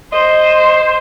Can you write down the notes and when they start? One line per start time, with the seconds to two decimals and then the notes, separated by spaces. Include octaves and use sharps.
0.13 C5 D#5